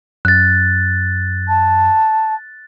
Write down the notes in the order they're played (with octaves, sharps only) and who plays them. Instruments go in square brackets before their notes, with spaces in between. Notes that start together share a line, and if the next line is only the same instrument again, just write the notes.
[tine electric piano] F#2 [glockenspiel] F#6 A6
[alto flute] A5